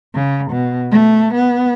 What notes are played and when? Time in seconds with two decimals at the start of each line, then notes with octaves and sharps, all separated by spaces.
0.15 C#3
0.51 B2
0.91 A3
1.34 B3